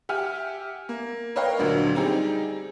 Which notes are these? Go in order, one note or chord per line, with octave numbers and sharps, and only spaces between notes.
G4 E5 F#5 G#5 F6
A#3
A#4 B4 C#5 D#5 F5 G5
D2 A#2 D3 F#3
G3 C4 D#4 G4 G#4